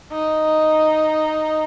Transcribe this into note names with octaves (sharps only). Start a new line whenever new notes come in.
D#4